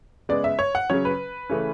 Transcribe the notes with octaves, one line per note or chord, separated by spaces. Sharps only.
C#3 G#3 B3 D5
E5
C#5
F#5
C#3 F#3 C#4 C#5
B4
C#3 E3 A3 C#4